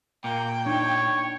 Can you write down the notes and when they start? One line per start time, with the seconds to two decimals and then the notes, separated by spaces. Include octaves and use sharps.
0.24 A#2 A#3 G5
0.66 D4 D#4 C#5